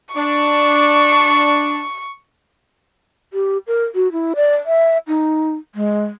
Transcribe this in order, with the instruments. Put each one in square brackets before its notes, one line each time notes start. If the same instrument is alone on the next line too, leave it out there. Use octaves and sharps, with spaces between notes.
[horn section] D4 [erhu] C#6
[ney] G4
A#4
F#4
E4
D5
E5
D#4
G#3